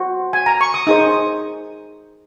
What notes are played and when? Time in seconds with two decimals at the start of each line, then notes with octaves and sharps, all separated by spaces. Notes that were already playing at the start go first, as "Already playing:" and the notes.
Already playing: F#4 C5
0.33 G#5
0.46 A#5
0.61 C#6
0.74 D#6
0.87 D#4 G#4 C5 D#6